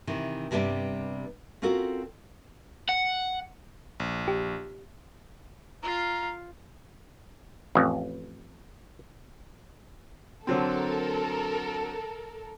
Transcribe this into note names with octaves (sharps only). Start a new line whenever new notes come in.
C3 D#3 E3
G2 C3 G3 B3 D4 D5
C4 C#4 F4 F#4 A4 A#4
F#5
A#1
G4
F4 F5 A#5
A1 F2
D3 F#3 C4 A4 A#4